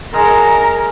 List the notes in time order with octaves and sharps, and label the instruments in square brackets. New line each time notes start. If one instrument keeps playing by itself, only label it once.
[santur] G#3 [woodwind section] A#4 [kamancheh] A#5